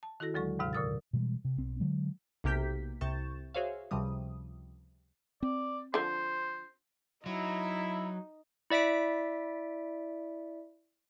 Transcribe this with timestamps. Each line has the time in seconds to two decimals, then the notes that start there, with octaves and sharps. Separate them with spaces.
0.03 A5
0.20 D#3 E4 F#4 A4 A#6
0.34 D2 D3 F#3 G#3 A4 C#6
0.59 D#2 G#2 C3 F5 F6
0.73 A#2 D3 A#4 D#6 E6 A6
1.13 B2 E3 G3 G#3
1.45 C3
1.57 B1 C4
1.80 D3 F#3 G#3
2.44 B1 C3 A#3 G4 G6 B6
3.01 C2 C3 C#6 G6 A6 E7
3.54 F#4 G#4 C5 C#5 E5 F5
3.91 C#2 C3 F3 G3 D#6
5.43 C4 D5
5.94 D3 F3 C5
7.26 F#3 D#4 E4
8.70 E4 D5 E5 B6 D7